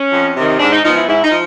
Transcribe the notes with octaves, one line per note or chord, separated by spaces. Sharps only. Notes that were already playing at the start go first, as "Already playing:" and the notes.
Already playing: C#4
F2
C3 D#3
G#2 D4
D#4
F3 G#3 B3 D#4
E4
G#2 E4
D#4
F3